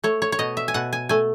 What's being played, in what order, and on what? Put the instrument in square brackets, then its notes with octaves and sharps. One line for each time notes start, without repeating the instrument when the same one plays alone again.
[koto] A3 C#5
C#5
C#5
B2 D#5
E5
G#5
B2 F#5
G#5
A3 G#5